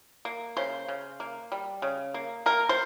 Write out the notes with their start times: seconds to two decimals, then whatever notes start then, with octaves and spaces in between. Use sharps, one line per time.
0.25 A#3
0.57 C#3 C5
0.88 C#3
1.20 A#3
1.52 G3
1.82 C#3
2.14 A#3
2.46 A#3 A#4
2.69 C5